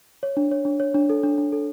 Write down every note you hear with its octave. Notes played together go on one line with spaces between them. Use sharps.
C#5
D4
C#5
D4
C#5
D4
A4
D4
D4
A4